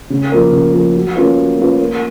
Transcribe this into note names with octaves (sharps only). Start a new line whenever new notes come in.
C#3
F3 A#3
C#3
F3 A#3
F#3
A#3 C#4 F4 B4
F#3
A#3 C#4 F4 B4
A#3